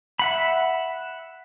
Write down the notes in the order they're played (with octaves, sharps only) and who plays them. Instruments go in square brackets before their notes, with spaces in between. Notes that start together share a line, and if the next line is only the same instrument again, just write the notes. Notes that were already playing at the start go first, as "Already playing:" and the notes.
[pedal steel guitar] E5 F#5 B5